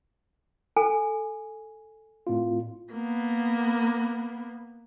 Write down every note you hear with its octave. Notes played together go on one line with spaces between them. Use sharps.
A4 G#5
A2 C4 F4
A#3 B3